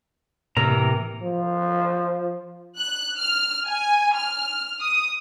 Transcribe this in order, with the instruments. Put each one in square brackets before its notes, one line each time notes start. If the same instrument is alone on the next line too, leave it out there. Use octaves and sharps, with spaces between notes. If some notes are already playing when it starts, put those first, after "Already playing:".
[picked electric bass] A2 A#3 [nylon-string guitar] C3 [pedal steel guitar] E3 A#4 A#5
[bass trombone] F3
[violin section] F#6
F6
G#5
F6
D#6